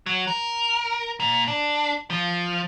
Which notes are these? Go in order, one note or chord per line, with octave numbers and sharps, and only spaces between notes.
F#3
A#4
A#2
D4
F3